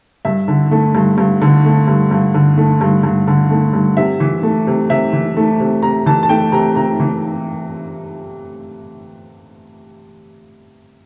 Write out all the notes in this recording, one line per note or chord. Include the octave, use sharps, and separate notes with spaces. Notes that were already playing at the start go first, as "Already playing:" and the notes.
G2 E5
D3
A3
G2
G2
D3
A3
G2
G2
D3
A3
G2
G2
D3
A3
G2
C3 E5
E3
A3
C3
C3 E5
E3
A3
C3
C3 A#5
E3 A5
A5
A3 G5
C3 A#5
C3 A#5
E3